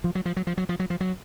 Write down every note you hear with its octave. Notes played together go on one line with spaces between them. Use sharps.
F3
F#3
F3
F#3
F3
F#3
F3
F#3
F3
F#3